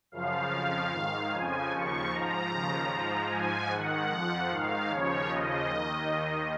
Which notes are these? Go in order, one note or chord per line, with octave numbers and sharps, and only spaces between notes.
F#2 C#3 F3 F5
F2 C#3 F3 F5
G#2 D#3
F2 C#3 F3 G#5
D#2 C#3 F3 C#6
G#2 F3 A#5
D#2 C#3 F3
G#2 F3
G#2 F3 G#5
G#2 D#3 F#5
F2 F3
G#2 D#3 F5
D#2 C#3 F3 C#5
D#2 C#3 F3 D#5
D#2 D#3